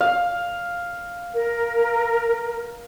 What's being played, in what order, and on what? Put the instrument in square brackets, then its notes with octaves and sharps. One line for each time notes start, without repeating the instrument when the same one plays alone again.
[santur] F5
[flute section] A#4